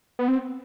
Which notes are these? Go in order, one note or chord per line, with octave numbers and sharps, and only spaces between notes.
B3
C4